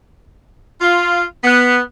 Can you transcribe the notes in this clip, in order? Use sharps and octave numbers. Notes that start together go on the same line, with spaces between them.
F4
B3